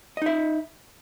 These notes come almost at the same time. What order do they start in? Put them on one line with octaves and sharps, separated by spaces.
D#5 D#4 E5